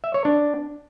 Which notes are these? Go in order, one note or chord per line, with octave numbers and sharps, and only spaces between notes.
E5
C#5
D4